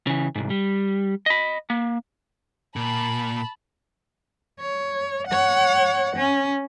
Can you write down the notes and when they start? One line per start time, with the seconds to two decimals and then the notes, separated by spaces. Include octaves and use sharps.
0.07 C#3 E3
0.35 C2 G#2
0.50 G3
1.26 D#5 B5
1.70 A#3
2.76 A#2 A5 B5
4.60 C#5
5.27 C#5 F#5
6.16 C#4